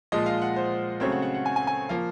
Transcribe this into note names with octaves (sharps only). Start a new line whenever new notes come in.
A#2 F3 G#3 D#5
F5
F#5
C5
C#3 F#3 A3 C4 C#5
F#5
F#5
F#5
G#5
G#5
G#5
F3 A#3 F5